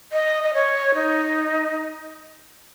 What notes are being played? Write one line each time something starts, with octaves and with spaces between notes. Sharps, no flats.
D#5
D#5
C#5
D#4